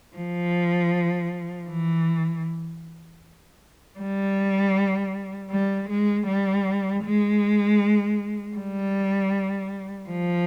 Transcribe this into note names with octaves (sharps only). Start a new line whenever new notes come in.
F3
E3
G3
G3
G#3
G3
G#3
G3
F3